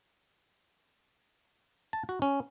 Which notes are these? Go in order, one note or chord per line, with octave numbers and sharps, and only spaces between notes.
A5
F#4
C#4